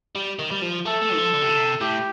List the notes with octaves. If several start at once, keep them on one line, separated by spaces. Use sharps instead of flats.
G3
D#3
G3
F3
A3 A4
A3
D#3
F3
D3
C3
D3
C3
A2 G4